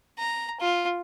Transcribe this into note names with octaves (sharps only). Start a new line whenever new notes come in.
A#5
F4